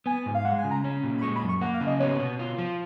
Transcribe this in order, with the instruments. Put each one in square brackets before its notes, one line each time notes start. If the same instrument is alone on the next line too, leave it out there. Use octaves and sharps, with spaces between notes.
[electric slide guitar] B3 [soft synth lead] G#5
[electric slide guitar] G#2
[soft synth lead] F5
[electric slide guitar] G#3 [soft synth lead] F#5
[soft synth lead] G#5
[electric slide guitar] C#3
[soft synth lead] A#5
[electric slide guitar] C#4
A#2
[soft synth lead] B5
[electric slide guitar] G#3 [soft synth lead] C#6
[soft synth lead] B5
[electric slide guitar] F#2
[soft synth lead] C#6
[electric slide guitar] A#3 [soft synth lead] F#5
[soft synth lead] F5
[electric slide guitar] C#3
[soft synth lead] D#5
[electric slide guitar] B3 [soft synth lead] C#5
[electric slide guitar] B2
F4
F3